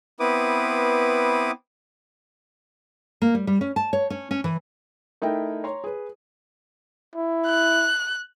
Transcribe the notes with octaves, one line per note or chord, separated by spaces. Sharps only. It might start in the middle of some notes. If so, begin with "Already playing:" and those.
B3 C4 E4 B4 D6 D#6
A#3
G3
G3
C#4
A5
C#5
C#4
C#4
E3
A3 D#4 E4 A#4 G5
C#5 A#5 C6
G#4 B4
E4
F#6